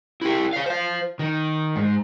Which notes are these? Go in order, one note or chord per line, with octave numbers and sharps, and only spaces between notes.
E4 G4
C#5 F5
C5 F5
D#3
G#2